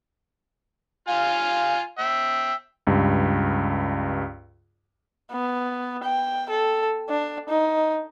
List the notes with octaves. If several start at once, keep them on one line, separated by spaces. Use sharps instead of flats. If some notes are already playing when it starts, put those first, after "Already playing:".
F4 F5 G#5
E5 G5
C#2 G2
B3
G5
A4
D4
D#4